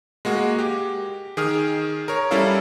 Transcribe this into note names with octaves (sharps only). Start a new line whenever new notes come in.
G#3 A#3 F#4 G#4
G4
D#3 G#4 D#6 F6
A#4 C#5
G3 C#4 E4 A4 A#4 F5